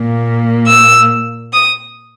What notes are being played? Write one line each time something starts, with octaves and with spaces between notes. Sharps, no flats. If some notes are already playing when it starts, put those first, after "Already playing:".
Already playing: A#2 A#3
E6
D#6